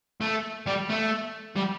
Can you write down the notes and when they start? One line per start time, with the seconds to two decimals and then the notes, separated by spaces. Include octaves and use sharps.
0.21 A3
0.66 G3
0.89 A3
1.56 G3